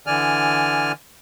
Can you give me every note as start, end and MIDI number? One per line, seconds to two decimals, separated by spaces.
0.07 0.92 50
0.07 0.92 52
0.07 0.92 74
0.07 0.92 80
0.07 0.92 89